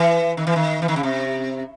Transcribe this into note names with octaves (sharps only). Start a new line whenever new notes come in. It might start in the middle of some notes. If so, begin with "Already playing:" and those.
Already playing: E3
D#3
E3
D#3
E3
D#3
C#3
C3